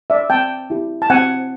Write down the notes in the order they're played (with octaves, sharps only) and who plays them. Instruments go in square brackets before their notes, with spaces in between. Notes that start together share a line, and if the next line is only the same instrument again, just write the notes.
[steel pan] D5 E5
C4 G5 A5
E4 G4
A5
C4 F#5 G#5